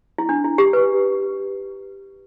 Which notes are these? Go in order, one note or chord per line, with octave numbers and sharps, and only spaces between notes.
E4
D4
E4
G4
B4